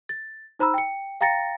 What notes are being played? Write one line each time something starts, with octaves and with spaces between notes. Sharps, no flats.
A6
D#4 C5 A#5 B5 E6
G5 C#7
F5 G5 A#5 A6 A#6 C#7